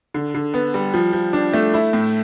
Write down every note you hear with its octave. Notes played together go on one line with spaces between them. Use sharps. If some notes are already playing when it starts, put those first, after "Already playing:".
D3
D3
B3
G3
F3
F3
D4
A3
E4
A2